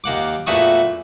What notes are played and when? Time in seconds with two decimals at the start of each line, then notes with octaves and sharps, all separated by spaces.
0.04 D#2 A#3 F#5 D6
0.46 E2 A#2 A3 E4 F#4 D#6